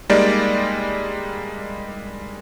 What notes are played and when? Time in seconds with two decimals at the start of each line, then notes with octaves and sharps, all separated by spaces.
0.10 G3 G#3 A#3 D#4 D5